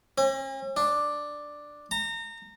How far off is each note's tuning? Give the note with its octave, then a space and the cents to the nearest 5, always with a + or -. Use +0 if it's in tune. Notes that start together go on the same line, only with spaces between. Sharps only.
C#4 -45
D4 +5
A#5 -30